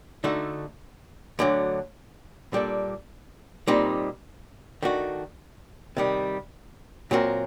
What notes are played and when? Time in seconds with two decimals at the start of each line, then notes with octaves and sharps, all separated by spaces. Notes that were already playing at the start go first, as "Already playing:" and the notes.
0.24 D3 A3 D#4 F#4 A4
1.39 D2 D3 F#3
2.53 A#2 G3 D4 A4
3.68 A#2 G3 C4 D#4
4.83 D#3 A3 D4 F#4
5.97 C3 D#3 G3
7.11 A#2 F#3 C4 F#4 A#4